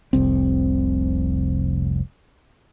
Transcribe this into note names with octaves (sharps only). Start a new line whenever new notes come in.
F1 C2 C4